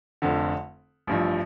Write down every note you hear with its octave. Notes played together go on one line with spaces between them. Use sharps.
F1 F2 D3
A1 G2 F3